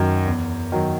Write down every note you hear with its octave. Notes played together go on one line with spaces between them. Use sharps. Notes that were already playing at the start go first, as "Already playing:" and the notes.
Already playing: F#2 D#3 F#3
E2
D#3 F#3